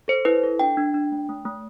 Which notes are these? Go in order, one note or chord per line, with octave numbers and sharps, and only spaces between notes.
A4 C5
E4 B4
A4
D4 G5
D4
D4
A3
A3
A3